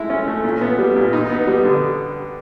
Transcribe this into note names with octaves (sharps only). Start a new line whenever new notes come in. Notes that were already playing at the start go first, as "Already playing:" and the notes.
Already playing: G#3 A3 E4
C#4
A3
A#2
B3
G3
A#2
D#4
B3
G3
D3